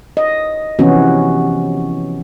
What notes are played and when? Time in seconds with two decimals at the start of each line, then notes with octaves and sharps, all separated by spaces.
0.17 D#5
0.79 C3 E3 F3 B3 C#4 F#4